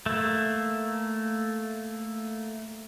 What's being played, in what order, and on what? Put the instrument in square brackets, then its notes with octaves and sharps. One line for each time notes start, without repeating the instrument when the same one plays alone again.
[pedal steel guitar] A3 A#3